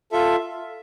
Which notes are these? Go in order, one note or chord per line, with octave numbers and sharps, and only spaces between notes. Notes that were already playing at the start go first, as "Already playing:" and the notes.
F4 A4 E5